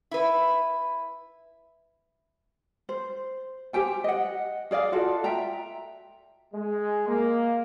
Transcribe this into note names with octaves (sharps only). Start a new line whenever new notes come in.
E4 B4
C5
G4 C5 G5 G#5
D#5 F#5
G#4 D5 D#5 F5
F4 F#4 A4 D5
E5 G5 A#5
G#3
A#3